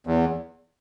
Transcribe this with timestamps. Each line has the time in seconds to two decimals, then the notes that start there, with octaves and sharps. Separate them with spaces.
0.07 E2